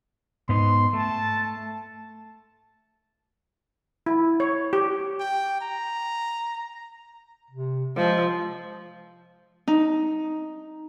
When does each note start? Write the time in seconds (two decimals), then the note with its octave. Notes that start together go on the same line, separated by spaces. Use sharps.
0.49 G#2 B3 D#4 C6
0.93 A3 A5
4.06 E4
4.40 C#5
4.73 G4
5.20 G5
5.61 A#5
7.51 C3
7.97 F3 G#3
9.68 D#4